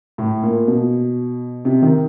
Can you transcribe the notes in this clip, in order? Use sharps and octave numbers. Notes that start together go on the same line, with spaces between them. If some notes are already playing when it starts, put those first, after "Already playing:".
A2
A#2
B2
C3
D#3